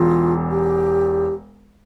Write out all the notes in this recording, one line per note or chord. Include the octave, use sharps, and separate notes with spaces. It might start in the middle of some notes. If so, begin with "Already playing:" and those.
Already playing: E1 E2 F4
G4